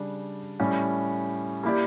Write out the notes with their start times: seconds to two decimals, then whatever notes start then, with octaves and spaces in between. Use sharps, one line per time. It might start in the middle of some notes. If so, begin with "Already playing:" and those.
Already playing: C#3 G3 D4
0.60 A2 G3 C#4
1.63 A#3 E4 G4 D5